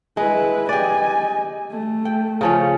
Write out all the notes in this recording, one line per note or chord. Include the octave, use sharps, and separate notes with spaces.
G#3 E4 B4
G4 D5 D#5 G#5
A3
G5
C#3 F3 C#4